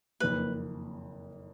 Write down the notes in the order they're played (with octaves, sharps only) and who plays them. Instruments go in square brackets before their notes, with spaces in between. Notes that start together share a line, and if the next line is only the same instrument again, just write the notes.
[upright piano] F#1 F2 D#3 A#3 [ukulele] B4